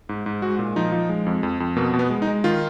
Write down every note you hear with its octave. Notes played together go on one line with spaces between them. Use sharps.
G#2
G#2
G#3 F#4
A#2
F3 D#4
F3
G#3
F2
F2
F2
B2 A#3
B2
B3
G#3
D#4
G#3
D#3 F4